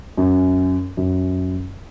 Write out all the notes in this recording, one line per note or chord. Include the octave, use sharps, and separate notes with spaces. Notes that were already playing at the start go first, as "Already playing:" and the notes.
F#2
F#2